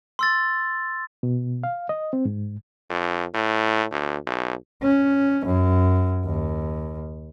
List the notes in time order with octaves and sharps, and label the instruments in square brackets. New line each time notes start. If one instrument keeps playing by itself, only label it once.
[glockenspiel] C6 E6 A6
[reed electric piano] B2
F5
D#5
C4
G#2
[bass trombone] F2
A2
D2
B1
[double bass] C#4
F#2
D#2